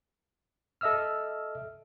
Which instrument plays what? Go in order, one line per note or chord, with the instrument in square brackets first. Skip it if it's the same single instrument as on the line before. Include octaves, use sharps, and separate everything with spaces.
[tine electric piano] A4 D#5 E5 E6 F6